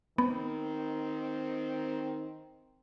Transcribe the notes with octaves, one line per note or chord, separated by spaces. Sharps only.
D#3 B3 C4